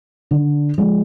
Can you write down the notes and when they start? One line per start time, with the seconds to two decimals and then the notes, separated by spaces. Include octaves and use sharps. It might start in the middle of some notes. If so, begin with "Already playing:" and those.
0.31 D3
0.78 F3 G#3